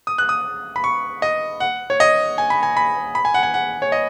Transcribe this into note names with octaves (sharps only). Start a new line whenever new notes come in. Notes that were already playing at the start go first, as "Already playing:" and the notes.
D#6
F#6
D#6
B5
C#6
D#5
F#5
C#5
D#5
G#5
B5
G#5
B5
B5
G#5
F#5
G#5
F#5
C#5
D#5